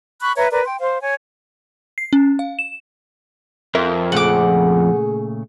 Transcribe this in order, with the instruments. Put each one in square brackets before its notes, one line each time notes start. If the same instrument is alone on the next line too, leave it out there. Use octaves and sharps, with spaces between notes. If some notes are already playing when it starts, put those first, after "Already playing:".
[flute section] B5 C#6 F#6
B4 C#5 E5 A#5
A#4 B4 D5 A#5
G5 C6
C5 F5
C#5 G#5
[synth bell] C7
C#4
F5
E7
[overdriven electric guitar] F2 [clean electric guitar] A#4 E5
[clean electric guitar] A#2 C#3 A3 [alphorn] G#4 [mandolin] F#5 D6